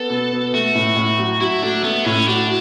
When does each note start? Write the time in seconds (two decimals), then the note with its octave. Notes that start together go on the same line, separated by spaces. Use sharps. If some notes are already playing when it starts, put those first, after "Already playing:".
Already playing: B3 A4
0.10 B2
0.32 B3
0.53 A3 F#4
0.75 A2
0.96 A2
1.18 F#3
1.40 F#3 E4
1.62 A3 D4
1.84 A3 B3
2.05 A2 C#4
2.27 D4 F#4